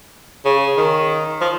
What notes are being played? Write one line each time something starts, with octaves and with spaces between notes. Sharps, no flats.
C#3
D#3
F3